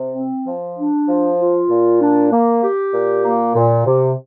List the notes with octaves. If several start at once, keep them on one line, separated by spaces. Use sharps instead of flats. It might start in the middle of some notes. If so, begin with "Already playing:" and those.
Already playing: C3
C4
F3
D4
F3
F4
A#2
D4
A#3
G4
A#2
A#3
A#2
C3